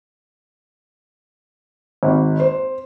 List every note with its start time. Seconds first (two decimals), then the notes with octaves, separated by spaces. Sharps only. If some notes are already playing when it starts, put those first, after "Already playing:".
2.03 G#1
2.40 C5